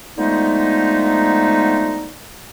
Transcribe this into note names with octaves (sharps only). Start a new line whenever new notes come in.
D3 F3 G#3 A3 B3 D#4